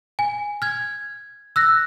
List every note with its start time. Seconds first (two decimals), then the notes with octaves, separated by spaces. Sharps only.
0.19 G#5
0.62 F6 G#6
1.56 E6 F#6 A#6